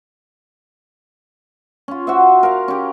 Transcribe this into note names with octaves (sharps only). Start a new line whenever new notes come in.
C#4 F4
F#4 C5 E5
A#4 F5
C#4 G4